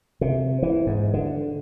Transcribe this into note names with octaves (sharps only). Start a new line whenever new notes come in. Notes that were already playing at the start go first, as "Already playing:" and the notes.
C3
E3
G#2
D3